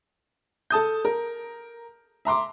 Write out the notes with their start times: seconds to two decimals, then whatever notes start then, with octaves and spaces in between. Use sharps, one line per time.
0.70 A4 A5 D#6 G6
1.05 A#4
2.25 E5 A#5 C6 D6